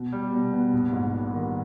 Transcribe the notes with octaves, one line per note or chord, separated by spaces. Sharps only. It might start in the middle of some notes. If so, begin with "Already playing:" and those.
Already playing: B2
G3
B2
B3
A#1
G#2
G3
D#3